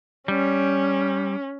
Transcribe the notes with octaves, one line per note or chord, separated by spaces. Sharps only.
G3 C#4